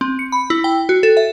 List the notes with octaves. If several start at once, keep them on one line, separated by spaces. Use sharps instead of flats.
C4
C#7
B5
E4
G5
F#4
A4
E5